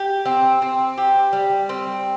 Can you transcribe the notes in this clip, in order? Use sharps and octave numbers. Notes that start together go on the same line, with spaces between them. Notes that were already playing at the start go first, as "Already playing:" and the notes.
Already playing: G4
C4
C4
G4
G3
C4